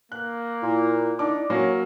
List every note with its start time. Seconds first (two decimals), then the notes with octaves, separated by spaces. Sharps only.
0.12 A#3 F#6
0.62 A#2 E4
1.19 D4 D#4 D6
1.50 F#3 A#3 C#4 A#6